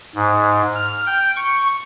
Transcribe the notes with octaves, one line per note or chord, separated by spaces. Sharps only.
G#2
F6
G5
C#6